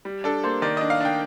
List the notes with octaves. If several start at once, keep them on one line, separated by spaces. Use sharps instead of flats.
G3
D4 A4
A#3 C5
D#3 D5
D4 D#5
F5
D4 G5